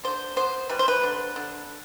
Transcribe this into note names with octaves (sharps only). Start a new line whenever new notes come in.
D3 C5
B3 C5
G3 B4
C5
B4
D3
D3